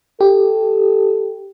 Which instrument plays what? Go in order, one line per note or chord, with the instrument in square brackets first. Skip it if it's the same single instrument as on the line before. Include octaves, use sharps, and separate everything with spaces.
[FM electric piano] G4 [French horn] A4